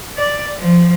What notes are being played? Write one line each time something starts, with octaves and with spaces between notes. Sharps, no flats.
D5
F3